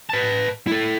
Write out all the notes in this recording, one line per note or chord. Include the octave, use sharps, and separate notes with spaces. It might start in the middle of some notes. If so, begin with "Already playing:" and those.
B4 A5
E4 A4